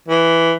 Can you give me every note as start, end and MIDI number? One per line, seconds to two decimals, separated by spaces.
0.08 0.54 52